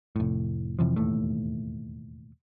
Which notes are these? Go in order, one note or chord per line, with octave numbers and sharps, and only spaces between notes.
F1 A2
F2 C3 E3 F3
E1 D#2 A2 A3